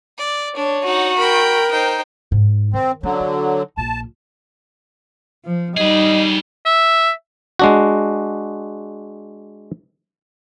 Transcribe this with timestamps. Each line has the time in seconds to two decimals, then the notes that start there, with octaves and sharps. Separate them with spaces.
0.18 D5
0.56 D4 C#5
0.84 D#4 F#4 F#5
1.18 A#4 G5 B5
1.71 D#4 C5 G5
2.32 G#2
2.74 D#3 C4
3.03 D3 F#3 C#4
3.20 D#4
3.77 A#1 F4 A5
5.45 F3
5.77 G3 D#4 G#4 B4 D#5
6.66 E5
7.59 G#3 D4 F#4